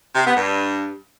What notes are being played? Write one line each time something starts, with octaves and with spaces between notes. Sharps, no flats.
C3
B3
G2